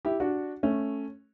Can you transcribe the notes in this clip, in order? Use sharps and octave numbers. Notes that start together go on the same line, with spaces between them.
E4 G4
D4 F#4
A3 C#4